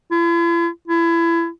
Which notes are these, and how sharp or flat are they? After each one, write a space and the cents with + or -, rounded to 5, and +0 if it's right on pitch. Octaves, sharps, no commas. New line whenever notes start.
E4 +45
E4 +30